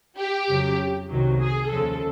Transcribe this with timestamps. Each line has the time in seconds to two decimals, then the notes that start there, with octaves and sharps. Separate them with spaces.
0.18 G4
0.48 F2 C#3 F#3
1.09 C2 C3 D#3 F#3
1.39 G#4
1.68 D#2 C#3 F3 G#3 A4